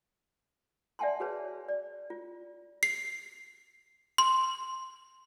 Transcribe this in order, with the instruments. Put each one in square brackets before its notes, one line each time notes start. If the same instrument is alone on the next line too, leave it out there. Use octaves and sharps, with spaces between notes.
[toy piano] D5 E5 F#5 G#5 A5 C6
F#4 G#4 B4 C#5
D5
F4
[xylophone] C7
C6